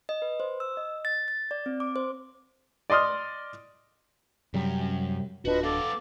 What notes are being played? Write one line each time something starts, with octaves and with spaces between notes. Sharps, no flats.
D#5
B4
C5
E6
D#5
A6
A6
D5
C4
D6
C5
D5 D#5 C6 D#6 F6
F#2 C3 F#3 G3
D1 D4 F4 F#4 B4 D#5
B3 A4 F5 D6